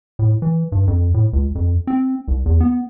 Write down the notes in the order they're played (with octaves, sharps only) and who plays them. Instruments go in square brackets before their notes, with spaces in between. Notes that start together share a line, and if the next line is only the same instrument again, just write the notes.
[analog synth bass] A2
E3
G2
F2
A2
C#2
F2
C4
C2
E2
B3